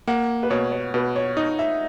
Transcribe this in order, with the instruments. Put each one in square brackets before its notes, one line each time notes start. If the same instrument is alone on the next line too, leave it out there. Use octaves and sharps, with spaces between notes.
[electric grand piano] A#3 [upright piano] F#5
[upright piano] B4
[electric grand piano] B2 [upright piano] C#5
[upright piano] C#5
[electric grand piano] B2 [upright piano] B4
[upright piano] C#5
[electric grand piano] D#4 [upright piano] D#5
[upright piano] E5